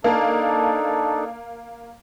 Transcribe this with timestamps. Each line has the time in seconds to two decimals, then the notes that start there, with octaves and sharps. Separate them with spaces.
0.04 A#3 D4 D#4 A4